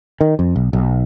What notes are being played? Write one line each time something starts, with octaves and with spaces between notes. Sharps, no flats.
D#3
F2
B1
B1